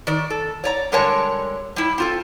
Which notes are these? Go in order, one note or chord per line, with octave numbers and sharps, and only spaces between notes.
D#3 D5
A4
C#5 D5 A#5
D3 G3 G#3 A#4 C#5 A5
G3 E4
C4 F4 A4